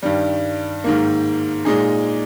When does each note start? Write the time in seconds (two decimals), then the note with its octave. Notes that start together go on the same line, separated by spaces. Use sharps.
0.02 G2 D#3 G3
0.84 G#2 D#3 A#3
1.65 A#2 G#3 D#4 G#4